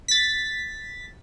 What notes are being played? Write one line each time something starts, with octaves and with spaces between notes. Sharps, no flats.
A6 B6